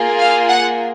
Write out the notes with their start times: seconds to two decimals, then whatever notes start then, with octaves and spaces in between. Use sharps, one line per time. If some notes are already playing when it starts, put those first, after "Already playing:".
Already playing: A#3 F4 G#4
0.19 F5
0.48 F#5